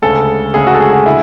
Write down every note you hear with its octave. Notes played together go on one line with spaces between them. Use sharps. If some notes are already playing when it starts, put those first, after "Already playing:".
D2 C#3 G#3 A4
D2 C#3 G#3 G#4
F#4
A4
G#4
F#4
D3 E4